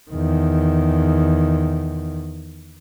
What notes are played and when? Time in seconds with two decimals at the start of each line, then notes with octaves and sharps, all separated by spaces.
0.11 E2 D#3